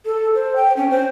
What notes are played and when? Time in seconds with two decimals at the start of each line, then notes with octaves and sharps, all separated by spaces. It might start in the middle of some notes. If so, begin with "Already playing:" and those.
0.05 A4
0.35 C5
0.56 G5
0.77 C#4
0.90 C5